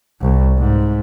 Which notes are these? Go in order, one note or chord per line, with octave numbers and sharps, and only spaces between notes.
C2
G#2